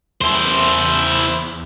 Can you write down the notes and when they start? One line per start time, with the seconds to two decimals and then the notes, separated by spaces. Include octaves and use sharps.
0.21 E2 E4 C5